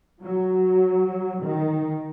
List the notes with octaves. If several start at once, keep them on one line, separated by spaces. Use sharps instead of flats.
F#3
D#3